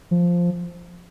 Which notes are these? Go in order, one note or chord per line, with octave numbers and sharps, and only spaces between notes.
F3